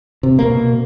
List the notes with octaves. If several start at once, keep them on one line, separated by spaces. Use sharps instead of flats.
C3
B2 A#3